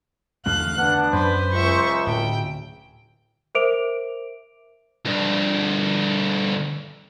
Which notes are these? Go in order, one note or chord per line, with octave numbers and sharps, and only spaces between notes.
E2 D3 A3 F5 F#6
B3 D4 F#5
F#2 B4 C5
C#2 E5 C#6
D1 G5
A#4 C5 E5 D6 D7 F7
D2 G2